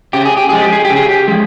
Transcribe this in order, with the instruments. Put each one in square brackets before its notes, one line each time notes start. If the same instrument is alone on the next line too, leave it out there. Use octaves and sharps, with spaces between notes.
[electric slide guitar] C#3 G4
G#4
G4
F3 G#3 G#4
G4
G#4
G4
C#3
G#4
G4
F3 G#3